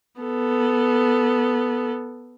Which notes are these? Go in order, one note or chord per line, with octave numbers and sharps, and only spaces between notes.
B3 A4